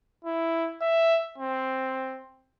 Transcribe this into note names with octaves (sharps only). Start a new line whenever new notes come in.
E4
E5
C4